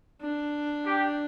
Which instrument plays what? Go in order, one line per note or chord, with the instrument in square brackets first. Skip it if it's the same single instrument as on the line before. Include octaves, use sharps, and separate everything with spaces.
[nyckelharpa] D4
[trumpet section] G4